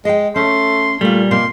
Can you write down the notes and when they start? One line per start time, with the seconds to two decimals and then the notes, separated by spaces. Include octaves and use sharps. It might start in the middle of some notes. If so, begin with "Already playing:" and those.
0.05 G#3 D#5 G5
0.36 A3 C#4 C6
1.01 A#2 G3 A3 F4
1.31 B2 A#3 C6